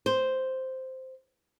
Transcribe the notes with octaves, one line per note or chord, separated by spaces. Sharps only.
C5